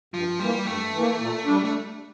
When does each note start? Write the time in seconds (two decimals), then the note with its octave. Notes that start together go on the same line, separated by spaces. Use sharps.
0.14 G2 F3
0.39 E3 G3 A#3
0.66 G2 A3
0.93 E3 A#3
1.19 A#2
1.45 G3 D4
1.65 A3